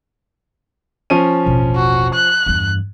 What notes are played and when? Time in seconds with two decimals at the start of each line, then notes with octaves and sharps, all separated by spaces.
1.10 F3 C#4 D#7
1.46 E1 A1
1.75 F#4
2.14 F#6
2.46 E2 G2